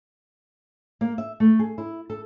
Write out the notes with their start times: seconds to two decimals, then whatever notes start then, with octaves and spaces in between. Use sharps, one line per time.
1.01 A#3
1.18 E5
1.40 A3
1.59 G#4
1.78 E4
2.10 A4